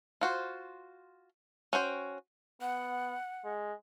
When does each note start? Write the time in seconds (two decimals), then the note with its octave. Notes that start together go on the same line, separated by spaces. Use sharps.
0.21 F4 F#4 C5
1.73 C#4 F#4 C5 G5
2.61 B3 F#5
3.45 G#3